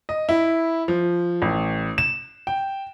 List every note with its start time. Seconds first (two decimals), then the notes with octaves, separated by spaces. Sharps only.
0.09 D#5
0.29 E4
0.88 F3
1.42 A1
1.98 E7
2.47 G5